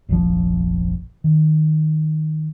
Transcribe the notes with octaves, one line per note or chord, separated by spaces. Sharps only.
F1 A#1 F3
D#3